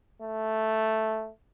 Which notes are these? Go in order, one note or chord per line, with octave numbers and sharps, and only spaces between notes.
A3